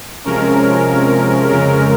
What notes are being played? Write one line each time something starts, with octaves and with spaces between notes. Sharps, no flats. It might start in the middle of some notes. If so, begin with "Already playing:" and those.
C3 F3 G#3 C#4 A#4
F2 C#3 G#3 C#4 A#4